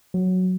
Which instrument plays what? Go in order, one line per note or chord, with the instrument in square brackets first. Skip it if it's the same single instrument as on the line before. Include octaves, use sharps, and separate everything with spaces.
[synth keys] F#3